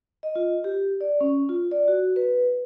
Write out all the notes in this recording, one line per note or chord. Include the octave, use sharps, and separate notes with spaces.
D#5
F4
G4
D5
C#4
F4
D5
F#4
B4